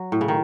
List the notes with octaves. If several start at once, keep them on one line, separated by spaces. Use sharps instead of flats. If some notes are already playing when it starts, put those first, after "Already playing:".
Already playing: F#3
A2
C#3
D#3